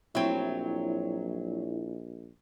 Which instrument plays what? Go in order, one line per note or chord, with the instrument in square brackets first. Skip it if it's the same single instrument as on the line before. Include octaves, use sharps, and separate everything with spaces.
[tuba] A#1 [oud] F#3 C4 [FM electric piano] E4